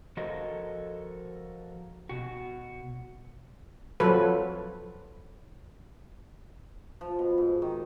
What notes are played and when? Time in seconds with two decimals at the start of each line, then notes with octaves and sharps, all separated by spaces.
0.17 F3 F#4 A4 A#4 C#5 D#5
2.09 B2 F#4
4.00 F3 F#3 A4 B4
7.01 F3
7.19 B2
7.38 G#2
7.62 D#3